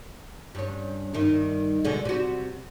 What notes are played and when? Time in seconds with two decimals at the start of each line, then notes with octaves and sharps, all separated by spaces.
0.55 G2 C#4
1.14 G2 D#3 E4
1.84 B2 D3 G#3
2.05 C3 F#4